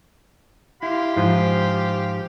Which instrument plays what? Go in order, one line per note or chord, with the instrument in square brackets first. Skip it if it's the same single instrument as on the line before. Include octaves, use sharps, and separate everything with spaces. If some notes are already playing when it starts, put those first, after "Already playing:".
[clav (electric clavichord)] E4 [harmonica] G4 F5 C6
[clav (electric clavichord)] G#2 F3